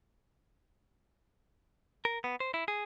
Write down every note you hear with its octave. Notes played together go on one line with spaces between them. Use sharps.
A#4
B3
C5
E4
G#4